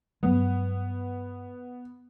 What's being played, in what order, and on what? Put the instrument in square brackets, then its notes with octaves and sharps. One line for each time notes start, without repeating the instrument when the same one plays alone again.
[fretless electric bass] G2 F#3 G#3 [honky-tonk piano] B3